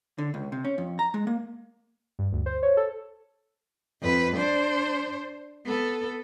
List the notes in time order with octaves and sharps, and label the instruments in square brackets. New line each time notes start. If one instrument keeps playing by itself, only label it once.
[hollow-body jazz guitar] D3
C#2
C3
C#4
F2
A#5
G#3
A#3
[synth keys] G2
D2
C5
C#5
A4
[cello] F2 B4
D4 C5
B3 A4